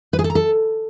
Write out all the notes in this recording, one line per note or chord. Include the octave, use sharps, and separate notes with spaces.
B4
G#4
A4
A#5
A4